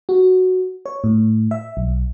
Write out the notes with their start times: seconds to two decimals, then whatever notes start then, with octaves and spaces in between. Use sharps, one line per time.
0.09 F#4
0.86 C#5
1.04 A2
1.51 E5
1.77 B1